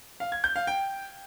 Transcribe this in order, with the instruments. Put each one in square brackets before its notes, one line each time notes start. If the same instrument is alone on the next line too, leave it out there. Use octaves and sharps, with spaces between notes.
[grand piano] F5
G#6
G6
F5
G5